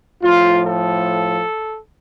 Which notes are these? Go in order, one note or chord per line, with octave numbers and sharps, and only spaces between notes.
A2 F3 F4
A4